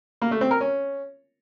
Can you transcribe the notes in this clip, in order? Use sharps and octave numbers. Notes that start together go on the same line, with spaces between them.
A#3
A3
C4
A#4
C#4